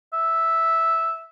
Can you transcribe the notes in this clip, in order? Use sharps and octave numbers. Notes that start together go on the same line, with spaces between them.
E5